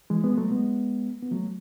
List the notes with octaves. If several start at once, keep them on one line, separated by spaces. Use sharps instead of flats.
E3 G#3
G#3 B3
F#3 A3
G#3 B3
B3
F#3 A3